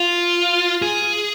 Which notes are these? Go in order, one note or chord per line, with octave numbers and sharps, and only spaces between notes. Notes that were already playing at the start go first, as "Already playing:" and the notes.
Already playing: F4
G#4